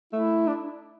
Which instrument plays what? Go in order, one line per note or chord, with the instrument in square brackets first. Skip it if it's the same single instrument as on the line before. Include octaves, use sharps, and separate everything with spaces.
[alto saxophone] A3 [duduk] E4
[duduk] D4